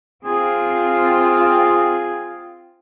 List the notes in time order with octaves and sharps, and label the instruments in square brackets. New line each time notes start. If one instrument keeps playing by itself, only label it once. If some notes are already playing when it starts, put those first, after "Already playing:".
[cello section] C4 F4 [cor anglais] G#4